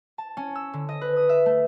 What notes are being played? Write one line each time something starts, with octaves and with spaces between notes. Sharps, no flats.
A5
C#4
E6
D3
D#5
B4
D#6
E5
A3